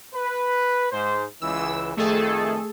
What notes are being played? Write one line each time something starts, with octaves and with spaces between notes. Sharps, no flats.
B4
G#2 C5
C#2 E3 E6
F2 D#3 A3 G#4 A4